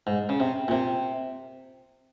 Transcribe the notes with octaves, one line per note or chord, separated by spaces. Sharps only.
G#2
C#3
C3
A#2
C3